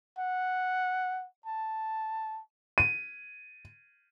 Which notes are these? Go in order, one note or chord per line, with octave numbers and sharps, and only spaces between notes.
F#5
A5
D#7